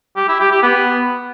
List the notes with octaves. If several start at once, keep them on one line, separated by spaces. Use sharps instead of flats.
G4
E4
G4
G4
B3